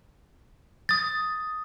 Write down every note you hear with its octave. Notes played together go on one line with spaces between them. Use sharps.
D#6 A6